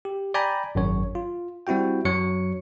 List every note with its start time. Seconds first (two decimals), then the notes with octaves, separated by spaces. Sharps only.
0.05 G4
0.34 D5 G5 G#5 A#5 B5
0.75 G#1 F#2 C#5
1.15 F4
1.67 G3 C4 E4 F#4 G5
2.05 F#2 F#3 C#5 C#7